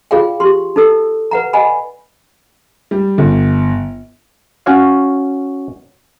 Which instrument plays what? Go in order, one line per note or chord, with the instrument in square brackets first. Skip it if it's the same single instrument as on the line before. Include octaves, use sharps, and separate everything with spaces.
[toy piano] F4 G#4 D5 F5 G5
G4 C6
D#4 A4 E6
B4 F#5 A#5
D5 D#5 F#5 G#5 B5
[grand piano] G3
G1
[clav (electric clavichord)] C#4 F#4 C#5 F5